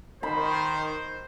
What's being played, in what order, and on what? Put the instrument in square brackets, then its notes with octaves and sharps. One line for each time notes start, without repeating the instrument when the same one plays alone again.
[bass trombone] D#3 [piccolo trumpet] C5 [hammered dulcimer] B5